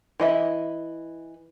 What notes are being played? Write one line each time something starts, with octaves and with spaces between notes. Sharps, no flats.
E3 D#5 E5